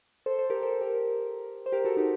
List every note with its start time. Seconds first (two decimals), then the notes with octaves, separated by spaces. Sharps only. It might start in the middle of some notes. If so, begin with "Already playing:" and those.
0.26 A4 C5
0.39 A4 C5
0.50 G4 A#4
0.63 A4 C5
0.81 G4 A#4
1.66 C5
1.72 G4 A#4
1.85 F#4 A4
1.97 D#4 G4